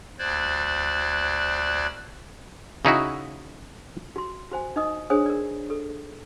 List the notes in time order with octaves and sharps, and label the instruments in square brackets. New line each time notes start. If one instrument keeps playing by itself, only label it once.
[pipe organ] D2 C5 D5 F#6 G#6
[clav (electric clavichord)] C#3 D#4 E4 F#4
[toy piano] F#4 C6
F#4 C5 G#5
D#4 D#5 D#6
D4 G#4 C5 C#5 G#5 D#6
A#4 D5
A4